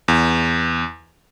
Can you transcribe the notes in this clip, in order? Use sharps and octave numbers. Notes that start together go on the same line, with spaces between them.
E2